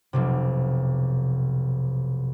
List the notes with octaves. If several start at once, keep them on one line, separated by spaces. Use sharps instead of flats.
F1 B1 C3